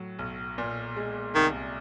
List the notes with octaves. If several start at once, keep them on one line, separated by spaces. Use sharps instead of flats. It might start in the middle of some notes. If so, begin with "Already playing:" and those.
Already playing: A2 F#3
B1
A#2
G#3
C2 D#3